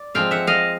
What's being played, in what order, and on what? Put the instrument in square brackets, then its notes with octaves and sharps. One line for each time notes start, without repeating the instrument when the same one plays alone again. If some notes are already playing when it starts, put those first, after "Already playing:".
Already playing: [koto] D5
F3 G#3 C4 F4 F5 G5
E5 F#5
D#5 F5